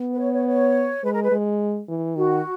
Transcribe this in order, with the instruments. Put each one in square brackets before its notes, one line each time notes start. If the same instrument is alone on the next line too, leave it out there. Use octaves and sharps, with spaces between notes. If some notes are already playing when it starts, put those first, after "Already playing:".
Already playing: [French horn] B3
[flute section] B4
C#5
C#5
C#5
[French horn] G#3 [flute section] B4
[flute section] A#4
B4
[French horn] G#3
E3
[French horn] D#3 [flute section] F#4